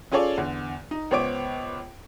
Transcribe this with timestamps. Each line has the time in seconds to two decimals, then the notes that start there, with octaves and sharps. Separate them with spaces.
0.12 C#4 F4 G#4 A4 C#5 D5
0.38 E2 D3
0.91 D#4
1.11 C#2 B3 C5 C#5 D6 D7